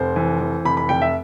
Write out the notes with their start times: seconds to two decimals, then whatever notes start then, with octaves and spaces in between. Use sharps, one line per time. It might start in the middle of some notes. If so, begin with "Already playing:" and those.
Already playing: F1 C5
0.16 E3
0.41 E3
0.65 F1 B5
0.77 B5
0.89 F1 G5
1.02 E5